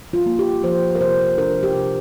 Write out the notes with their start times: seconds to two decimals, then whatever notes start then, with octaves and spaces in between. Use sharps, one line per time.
0.13 F4
0.26 A#3
0.39 G4
0.64 F3 C5
0.95 A#4
1.01 C3 C5
1.38 D4 A#4
1.63 G4
1.75 C3